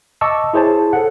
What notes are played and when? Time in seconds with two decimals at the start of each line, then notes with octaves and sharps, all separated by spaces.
0.21 D#5 A5 C#6 D6 E6
0.54 E4 G#4 C5 C#5 A5
0.93 A4 F#5